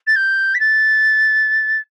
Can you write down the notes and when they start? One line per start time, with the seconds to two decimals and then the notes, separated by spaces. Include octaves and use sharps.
0.07 A6
0.15 G6
0.54 B6
0.60 A6